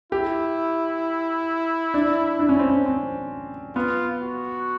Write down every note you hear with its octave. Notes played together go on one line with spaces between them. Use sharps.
E4 G4
D4
D4
C#4
C4
C#4
C4
B3 F4
F#4